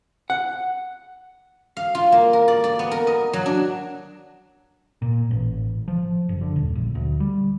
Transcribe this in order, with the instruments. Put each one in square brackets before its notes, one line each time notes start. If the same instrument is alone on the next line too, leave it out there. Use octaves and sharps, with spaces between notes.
[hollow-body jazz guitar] F#5
[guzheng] F5
F4
A#3
A#4
D5
D5
B3
A#4
D#5
F#3
D4
[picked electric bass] A#2
A1
F3
F#1
D3
D#1
A#1
D2
G3